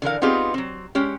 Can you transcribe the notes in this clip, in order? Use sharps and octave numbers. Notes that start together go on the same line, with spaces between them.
D3 E3 A#4 F5
B3 C4 D#4 F4 G4 G#4
F#3 C4
G#3 C#4 G4